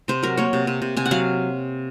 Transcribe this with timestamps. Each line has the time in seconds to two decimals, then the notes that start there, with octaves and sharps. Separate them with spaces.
0.08 C3 C5
0.23 F#3 A#4
0.37 A#3 C#5
0.53 C3
0.67 C3
0.82 C3
0.97 C3 G#5
1.06 F#5
1.11 F#3 F5